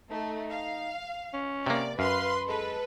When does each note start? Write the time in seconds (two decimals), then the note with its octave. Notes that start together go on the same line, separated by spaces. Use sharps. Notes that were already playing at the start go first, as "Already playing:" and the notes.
0.11 A3 D#4
0.52 F5
1.33 C#4
1.66 C3 A#3 D5
1.99 F#2 B4 F5 C6
2.48 G#3 A4 B4